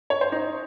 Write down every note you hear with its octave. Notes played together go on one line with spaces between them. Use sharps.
C#5
C5
D#4